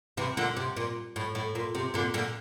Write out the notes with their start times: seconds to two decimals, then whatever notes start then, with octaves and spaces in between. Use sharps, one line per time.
0.17 C3 E3
0.37 A#2 D3
0.56 C3
0.77 A#2
1.16 A2
1.35 A2
1.55 A#2
1.75 C3
1.94 A#2 D3
2.14 A#2 D3